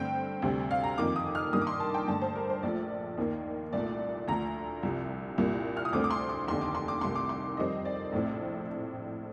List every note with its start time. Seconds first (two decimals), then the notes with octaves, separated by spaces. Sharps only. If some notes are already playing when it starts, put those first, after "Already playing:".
Already playing: G2 D3 A3 C4 G5
0.42 D2 C3 G3 C4
0.71 F5
0.84 A#5
0.98 F2 D#3 A#3 D6
1.16 D#6
1.35 F6
1.53 G2 D#3 A#3 D#6
1.61 D6
1.67 C6
1.80 A5
1.94 G5
2.07 G2 D3 A3 A5
2.22 C5
2.35 A#4
2.50 C5
2.63 A#1 A#2 F3 A3 D5
3.18 D#2 D#3 A#3
3.73 C2 A#2 A3 D5
4.28 D2 D3 F3 A3 A#5
4.83 C2 C3 F3
5.38 C2 A#2 G3 A#3
5.77 F6
5.85 D#6
5.93 D2 D3 A3 C4 D6
6.04 D6
6.11 C6
6.29 D6
6.48 F1 D#2 D3 C6
6.61 D6
6.75 C6
6.88 D6
7.01 C2 C3 D#3 A3 C6
7.15 D6
7.29 C6
7.57 F2 D#3 G3 C4 D#5
7.85 D5
8.12 A#1 A2 A3 C4